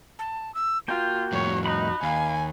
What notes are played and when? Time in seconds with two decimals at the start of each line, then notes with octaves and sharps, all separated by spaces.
0.19 A5
0.55 E6
0.88 A#3 F4 F#4 G5
1.32 F2 A2 C#5
1.66 D#4 B5 F#6
2.03 D#2 F5 G#5